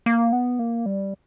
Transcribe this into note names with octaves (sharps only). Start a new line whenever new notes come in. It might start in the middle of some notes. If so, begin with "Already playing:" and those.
A#3
B3
A#3
G3